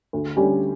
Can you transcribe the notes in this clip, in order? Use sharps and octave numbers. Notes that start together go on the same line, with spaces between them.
D2
D3 G3 C#4 G4